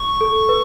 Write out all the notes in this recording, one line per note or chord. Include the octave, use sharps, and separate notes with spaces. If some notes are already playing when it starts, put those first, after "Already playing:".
Already playing: C#6
A4
B4